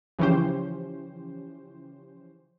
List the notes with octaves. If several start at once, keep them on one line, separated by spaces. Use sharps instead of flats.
C#3 E3 F3 C#4 G4 C5